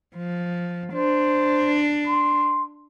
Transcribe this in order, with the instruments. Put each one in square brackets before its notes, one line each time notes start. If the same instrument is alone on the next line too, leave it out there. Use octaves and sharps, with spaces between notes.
[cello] F3
[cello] D4 [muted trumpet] C5
[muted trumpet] C6